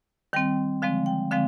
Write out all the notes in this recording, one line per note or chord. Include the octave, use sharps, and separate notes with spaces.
D#3 G3 C4 G5
D3 F3 G#3 C4 F5
G5
D3 F3 G#3 C4 F5